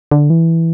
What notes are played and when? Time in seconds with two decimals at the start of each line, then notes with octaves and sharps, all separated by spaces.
0.11 D3
0.30 E3